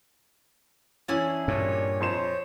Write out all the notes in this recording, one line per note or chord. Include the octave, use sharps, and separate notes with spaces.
E3 C#4 D4 E4 G#4
G2 A#2 C#5
F2 C5 C#5 C6 E7